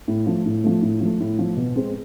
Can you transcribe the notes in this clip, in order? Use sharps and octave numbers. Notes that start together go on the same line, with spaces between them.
A2
F3 A3
A2
F3 A3
A2
F3 A3
A2
F3 A3
B2
G#3 C4